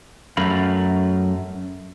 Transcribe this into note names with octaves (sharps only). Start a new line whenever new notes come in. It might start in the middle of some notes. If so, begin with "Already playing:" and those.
F#2 A3 A#4 F5 B5